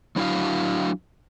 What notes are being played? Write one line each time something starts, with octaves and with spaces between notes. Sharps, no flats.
F#3 D4 E4 F#4 F5